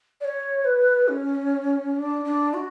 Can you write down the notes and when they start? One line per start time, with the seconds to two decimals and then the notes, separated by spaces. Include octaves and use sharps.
0.21 D5
0.25 C#5
0.65 B4
1.08 C#4
1.96 D4
2.25 D4
2.54 F#4